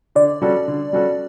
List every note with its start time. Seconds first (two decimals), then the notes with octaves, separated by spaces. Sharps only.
0.15 D3 D5
0.42 G3 C#4 F#4 A4
0.68 D3
0.93 G3 C#4 F#4 A4